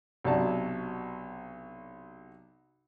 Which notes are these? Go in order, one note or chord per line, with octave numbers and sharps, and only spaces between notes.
B1 C3 F#3 D4 A5